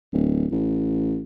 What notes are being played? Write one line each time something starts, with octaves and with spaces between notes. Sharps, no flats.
D1
A1